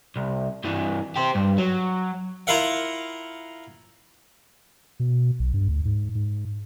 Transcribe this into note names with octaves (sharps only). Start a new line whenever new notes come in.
C2
G2 E3
G4 C5
G2
F#3
E4 F4 A#4 F5 F#5
B2
B1
G2
D2
G#2
G#2